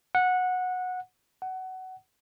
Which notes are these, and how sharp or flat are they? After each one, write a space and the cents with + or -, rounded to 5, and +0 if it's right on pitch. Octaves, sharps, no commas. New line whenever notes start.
F#5 -15
F#5 +20